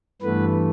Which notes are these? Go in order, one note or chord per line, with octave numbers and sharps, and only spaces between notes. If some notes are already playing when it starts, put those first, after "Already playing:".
G2 E3 A3 B3 B4